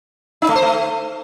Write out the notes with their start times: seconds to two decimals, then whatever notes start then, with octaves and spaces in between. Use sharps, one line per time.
0.42 D#4
0.49 A3
0.55 C5
0.62 A3